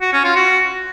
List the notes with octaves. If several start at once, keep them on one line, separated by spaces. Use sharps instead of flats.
F#4
C#4
F4
F#4